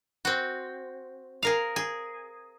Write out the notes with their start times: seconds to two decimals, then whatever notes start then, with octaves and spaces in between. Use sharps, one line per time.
0.25 C4 F#4
1.43 G#4 A#4 F5
1.76 G#4